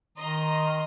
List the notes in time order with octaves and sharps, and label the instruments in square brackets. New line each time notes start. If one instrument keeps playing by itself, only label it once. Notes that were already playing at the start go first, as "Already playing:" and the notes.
[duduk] D#3 [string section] D#5 A#5 C6